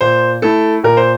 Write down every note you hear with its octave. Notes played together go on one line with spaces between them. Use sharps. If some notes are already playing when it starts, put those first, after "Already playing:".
A#2 C5
A3 E4 A4
A#2 A#4
C5